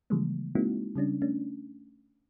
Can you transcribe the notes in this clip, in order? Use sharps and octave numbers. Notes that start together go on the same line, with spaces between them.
C#3 E3 F3 G3 G#3 A#3
G#3 A#3 C4 D#4 E4 F#4
C#3 G3 C#4 D4
A3 C#4 D4